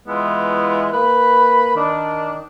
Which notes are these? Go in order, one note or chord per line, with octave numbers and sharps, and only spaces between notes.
E3 G#3 B3 E4 F4
A#3 B4 B5
D#3 D4